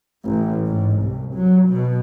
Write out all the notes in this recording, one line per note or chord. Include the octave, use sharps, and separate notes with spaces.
A1
G#2
C2
F#3
B2